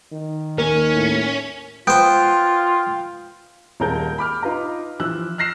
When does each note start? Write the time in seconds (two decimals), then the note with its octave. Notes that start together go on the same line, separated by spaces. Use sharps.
0.12 D#3
0.58 D#2 C#4 A#4
0.94 A2
1.87 B3 F4 C5 G5
3.80 D#1 G#3 G#4 A#4 A5 G6
4.18 B5 D6 F6
4.43 D#4 F4 B4 A#5
5.00 E3 F3 E6 F#6
5.38 F6 F#6 A#6 C7 E7